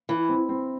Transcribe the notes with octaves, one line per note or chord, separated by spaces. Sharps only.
E3 E4
C4
C4